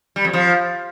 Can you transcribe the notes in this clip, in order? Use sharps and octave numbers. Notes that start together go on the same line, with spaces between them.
G3
F2
F3